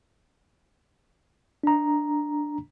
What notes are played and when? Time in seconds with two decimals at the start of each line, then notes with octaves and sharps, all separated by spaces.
1.63 D4 A#5